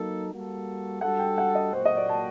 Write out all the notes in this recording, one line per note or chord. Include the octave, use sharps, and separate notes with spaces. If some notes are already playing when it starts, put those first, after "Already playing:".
Already playing: F#3 A#3 D#4 A4
G3 A#3 F#4 A4
G3 D4 F#4 A4 F#5
G5
F#5
D#5
A#2 F#3 A#3 F#4 C5
D#5
D5
A5